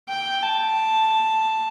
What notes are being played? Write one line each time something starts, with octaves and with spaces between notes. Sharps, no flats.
G5
A5